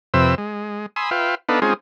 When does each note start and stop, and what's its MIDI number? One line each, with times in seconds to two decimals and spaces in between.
0.14 0.35 41
0.14 0.35 48
0.14 0.35 60
0.14 0.35 71
0.14 0.35 76
0.14 0.35 88
0.38 0.86 56
0.96 1.10 80
0.96 1.10 83
0.96 1.10 84
0.96 1.10 87
0.96 1.10 88
1.11 1.35 65
1.11 1.35 71
1.11 1.35 76
1.11 1.35 77
1.11 1.35 79
1.49 1.60 59
1.49 1.60 62
1.49 1.60 63
1.49 1.60 69
1.49 1.60 71
1.49 1.60 77
1.62 1.74 56
1.62 1.74 60
1.62 1.74 61
1.62 1.74 63
1.62 1.74 65
1.62 1.74 68